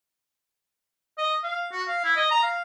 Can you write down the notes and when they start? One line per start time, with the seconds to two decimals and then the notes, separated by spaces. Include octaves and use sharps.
1.18 D#5
1.44 F5
1.72 F#4
1.88 F5
2.04 E4
2.16 D#5
2.31 A#5
2.43 F5